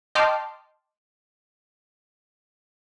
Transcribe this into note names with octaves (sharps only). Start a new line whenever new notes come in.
D#5 G5 A5 C6 D6 F6